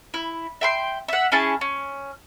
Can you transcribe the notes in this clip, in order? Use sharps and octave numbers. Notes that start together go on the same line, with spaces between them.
E4
E5 G5 C6
E5 F#5
C#4 E4 G#4 A5
C#4